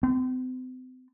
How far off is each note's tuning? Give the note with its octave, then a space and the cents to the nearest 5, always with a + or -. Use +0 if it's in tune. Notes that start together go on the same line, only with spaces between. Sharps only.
C4 -40